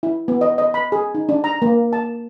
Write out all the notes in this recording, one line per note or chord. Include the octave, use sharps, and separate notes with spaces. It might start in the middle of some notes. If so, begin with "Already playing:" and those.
E4
B3
D#5
D#5
B5
G#4
D#4
D4
A#5
A#3
A5